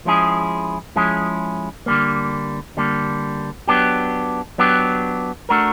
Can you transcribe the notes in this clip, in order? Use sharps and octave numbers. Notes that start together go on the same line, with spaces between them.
F3 G#3 C#4 E4 G#4
F3 G#3 C#4 E4 G#4
D3 G3 A#3
D3 G3 A#3
F#3 B3 D4 G4
F#3 B3 D4 G4
A3 D4 F#4 A#4